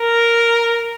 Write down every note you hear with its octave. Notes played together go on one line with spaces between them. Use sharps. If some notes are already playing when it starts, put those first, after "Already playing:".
Already playing: A#4